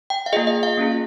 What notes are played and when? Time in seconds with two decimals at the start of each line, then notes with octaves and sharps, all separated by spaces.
0.10 G5
0.26 F5
0.33 A#3 F4 G#4 D#5
0.47 D#5
0.63 F5
0.77 A#3 C#4 F4 G#4